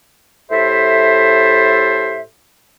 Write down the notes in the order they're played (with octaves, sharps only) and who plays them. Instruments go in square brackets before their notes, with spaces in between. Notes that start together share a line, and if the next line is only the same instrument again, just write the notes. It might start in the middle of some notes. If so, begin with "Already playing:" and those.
[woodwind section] A2 G4 A4 C5 E5